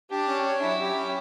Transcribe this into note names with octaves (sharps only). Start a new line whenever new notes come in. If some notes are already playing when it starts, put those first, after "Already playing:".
D4 G4
C#4
C#5
F#3 E4
G4
C#4